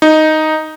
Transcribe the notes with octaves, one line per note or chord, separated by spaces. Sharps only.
D#4